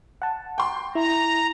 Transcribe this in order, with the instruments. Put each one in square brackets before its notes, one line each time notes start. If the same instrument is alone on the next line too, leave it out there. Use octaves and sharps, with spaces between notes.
[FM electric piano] F#5 A5
[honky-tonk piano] G5 C6
[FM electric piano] E4 [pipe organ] A#5